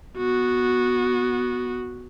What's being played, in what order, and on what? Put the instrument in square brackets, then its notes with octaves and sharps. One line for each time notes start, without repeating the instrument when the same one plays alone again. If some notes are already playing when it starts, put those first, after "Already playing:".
[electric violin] B3 F#4